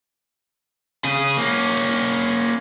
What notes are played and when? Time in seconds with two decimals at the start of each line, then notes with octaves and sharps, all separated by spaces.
1.04 C#3 G#4
1.37 A#3 C#4